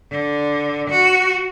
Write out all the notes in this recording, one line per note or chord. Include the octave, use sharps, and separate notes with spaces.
D3
F#4